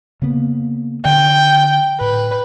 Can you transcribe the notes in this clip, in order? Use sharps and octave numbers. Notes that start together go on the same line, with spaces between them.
C#3 A#3 B3
D3 G5
A2 B4